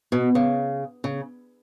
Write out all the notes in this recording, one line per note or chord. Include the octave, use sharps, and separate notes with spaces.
B2
C#3
C#3